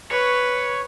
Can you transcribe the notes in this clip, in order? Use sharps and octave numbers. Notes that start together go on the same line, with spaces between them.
B4 C#5